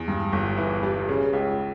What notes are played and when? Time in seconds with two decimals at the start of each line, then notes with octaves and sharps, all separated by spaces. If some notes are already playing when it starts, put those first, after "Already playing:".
Already playing: E2
0.08 G2
0.33 G1
0.58 E3
0.83 G3
1.09 C#3
1.33 C#2